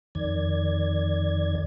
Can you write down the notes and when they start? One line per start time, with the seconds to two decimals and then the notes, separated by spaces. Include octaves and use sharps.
0.15 F2 D#3 D5 G#6